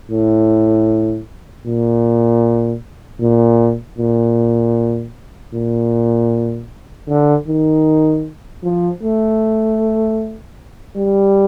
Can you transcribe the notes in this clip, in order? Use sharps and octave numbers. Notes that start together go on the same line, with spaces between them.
A2
A#2
A#2
A#2
A#2
D3
D#3
F3
A3
G3